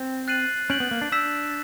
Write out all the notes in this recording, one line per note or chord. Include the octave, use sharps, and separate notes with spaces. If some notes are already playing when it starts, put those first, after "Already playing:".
Already playing: C4
F#6 A6 C7 D#7 F#7
C#4 G6 B6 D7 F#7
B3
A#3
D4
D4 E6 G6 B6 E7